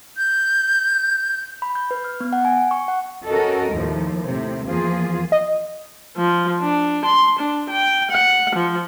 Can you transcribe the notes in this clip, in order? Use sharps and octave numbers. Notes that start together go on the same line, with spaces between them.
G6
B5
G6
B4
F6
B3
F#5
G#5
C#6
F#5
C#4 F#4 A4 A#4 D#5
D#2 A2 F3
A2 C3
E2 F3 A#3 F4 G#4
D#5
F3
D4
C6
D4
G5
F#5
F3